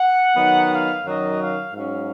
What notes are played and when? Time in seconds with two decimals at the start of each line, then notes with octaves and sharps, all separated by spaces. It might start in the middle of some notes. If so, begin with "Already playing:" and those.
Already playing: F#5
0.37 D#3 F#3 B3 D#4
0.71 F5
1.04 F#2 D#3 F#3 D#5
1.39 F5
1.73 G#2 F#3 C#4 F5